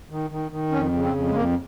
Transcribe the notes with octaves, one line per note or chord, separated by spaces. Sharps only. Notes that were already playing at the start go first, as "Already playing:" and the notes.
D#3
D#3
D#3
F2 C#4
C#3
C4
F2
G#3
F2 A#3